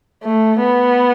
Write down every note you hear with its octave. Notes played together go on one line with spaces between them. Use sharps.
A3
B3